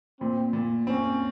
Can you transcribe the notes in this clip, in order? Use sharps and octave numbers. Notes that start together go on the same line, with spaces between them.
A#2 C4
A#2
C4 C#4